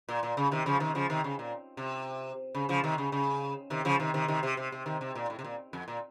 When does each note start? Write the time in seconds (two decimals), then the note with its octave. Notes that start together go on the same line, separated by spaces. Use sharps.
0.09 A#2
0.23 A#2
0.37 C#3
0.51 C3 D#3
0.66 C#3 F3
0.80 C3 D#3
0.95 C#3 F3
1.10 C3 D#3
1.24 C#3
1.39 A#2
1.77 C3
2.55 C#3
2.69 C#3 F3
2.84 C3 D#3
2.98 C#3
3.12 C#3
3.70 C3 D#3
3.85 C#3 F3
4.00 C3 D#3
4.14 C3 D#3
4.28 C3 D#3
4.43 C3
4.57 C3
4.72 C3
4.86 C3 D#3
5.01 C3
5.15 A#2
5.30 A2
5.39 C3
5.44 A#2
5.73 F2
5.88 A#2